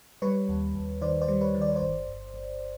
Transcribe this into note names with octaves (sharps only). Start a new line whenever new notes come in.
G3 B4 C#5
D#2
D#2
D#3 C5 D5
C5 D5
G3
B4 C#5
D#3
D5
C#5
G1 C5 D5
G1
G1